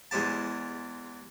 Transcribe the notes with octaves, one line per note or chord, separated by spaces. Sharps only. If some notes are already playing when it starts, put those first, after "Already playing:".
E2 G#3 C4 G4 A5